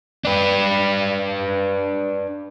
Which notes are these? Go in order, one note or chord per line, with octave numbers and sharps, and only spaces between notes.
D4 B4